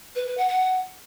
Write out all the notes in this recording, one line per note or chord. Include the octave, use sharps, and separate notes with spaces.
B4
B4
F#5
F#5